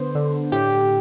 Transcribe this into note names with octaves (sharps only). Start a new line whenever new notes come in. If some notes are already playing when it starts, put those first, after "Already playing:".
Already playing: D3 B3 C5
D3
A2 G4